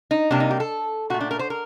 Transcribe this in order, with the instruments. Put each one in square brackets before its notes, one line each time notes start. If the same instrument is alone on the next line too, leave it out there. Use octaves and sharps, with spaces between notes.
[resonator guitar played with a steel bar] D#4
C3 G3 A#3 D4
D#4
G4
A4
A#2 A3 F#4
D4
A#4
C5
A#4